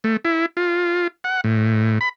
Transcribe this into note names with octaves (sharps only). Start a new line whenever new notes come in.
A3
E4
F4
F#5
A2
B5